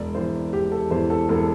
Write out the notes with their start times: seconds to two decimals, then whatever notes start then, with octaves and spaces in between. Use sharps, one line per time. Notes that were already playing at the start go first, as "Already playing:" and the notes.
Already playing: E1 D5
0.15 E2 E3 C5
0.53 E1 G4
0.72 A4
0.90 E2 E3 C5
1.10 A4
1.29 E1 A4